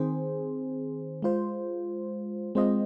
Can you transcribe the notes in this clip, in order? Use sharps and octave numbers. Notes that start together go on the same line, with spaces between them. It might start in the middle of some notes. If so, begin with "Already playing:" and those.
Already playing: D#3 C4 G#4 C5
G#3 F4 C5
G#3 C4 F4 C5 D#5